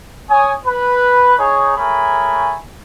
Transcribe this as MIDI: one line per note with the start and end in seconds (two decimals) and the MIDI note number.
0.30 0.53 73
0.30 0.53 80
0.30 0.53 87
0.66 1.37 71
1.38 1.75 63
1.38 1.75 68
1.38 1.75 73
1.77 2.55 57
1.77 2.55 68
1.77 2.55 70
1.77 2.55 73
1.77 2.55 80
1.77 2.55 83